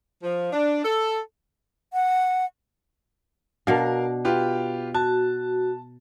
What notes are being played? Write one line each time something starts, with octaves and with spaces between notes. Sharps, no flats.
F3
D4
A4
F#5
B2 D4 A#4 F5
F4 G4 B4
F#4 A5